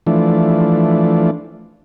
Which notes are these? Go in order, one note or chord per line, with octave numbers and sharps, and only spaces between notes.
E3 F3 A3 D4